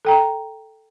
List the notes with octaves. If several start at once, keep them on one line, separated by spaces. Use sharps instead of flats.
A4 G5 A#5